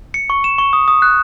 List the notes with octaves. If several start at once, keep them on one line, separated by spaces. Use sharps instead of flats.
C#7
C#6
E7
C#6
D#6
D#6
F#6